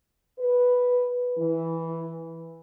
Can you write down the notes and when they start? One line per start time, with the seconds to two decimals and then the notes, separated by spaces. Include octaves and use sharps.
0.39 B4
1.38 E3